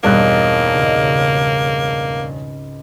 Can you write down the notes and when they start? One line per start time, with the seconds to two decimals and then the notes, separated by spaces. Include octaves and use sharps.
0.03 E1 G2 A#3 C4 D#4 F#4 F#6
0.72 C#2 G#2 C#3